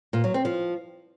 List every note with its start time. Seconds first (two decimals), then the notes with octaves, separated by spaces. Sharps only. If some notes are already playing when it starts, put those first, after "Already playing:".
0.13 A#2
0.24 F#3
0.34 C4
0.45 F3